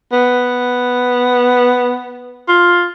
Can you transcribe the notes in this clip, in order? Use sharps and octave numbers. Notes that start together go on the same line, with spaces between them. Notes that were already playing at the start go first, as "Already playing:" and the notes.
B3
F4